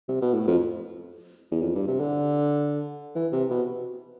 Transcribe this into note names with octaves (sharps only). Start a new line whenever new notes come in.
C3
B2
A2
F2
E2
F2
G2
C3
D3
E3
C3
B2